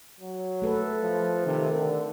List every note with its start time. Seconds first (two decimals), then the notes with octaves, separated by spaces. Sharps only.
0.20 F#3
0.62 A3 A4 B4
1.03 F3
1.46 C3 D#3
1.77 D3